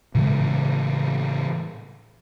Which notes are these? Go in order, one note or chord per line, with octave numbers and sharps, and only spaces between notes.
A2 C#3 E3 G#3